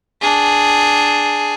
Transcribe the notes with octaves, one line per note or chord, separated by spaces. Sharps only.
D4 G#4